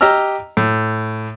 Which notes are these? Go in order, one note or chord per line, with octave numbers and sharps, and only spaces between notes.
G4 D#5 A#5 E6 F6
A2